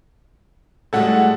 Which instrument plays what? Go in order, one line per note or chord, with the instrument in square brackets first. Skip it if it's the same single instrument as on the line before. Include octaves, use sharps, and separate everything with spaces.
[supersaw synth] A2 [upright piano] G3 G#3 F#4 [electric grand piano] A4 F#5